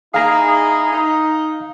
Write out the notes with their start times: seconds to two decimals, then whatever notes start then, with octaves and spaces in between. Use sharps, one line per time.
0.14 D#4 E4 G#4 F5 A#5
0.92 D#4